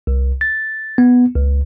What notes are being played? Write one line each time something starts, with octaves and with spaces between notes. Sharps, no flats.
C2
A6
B3
C#2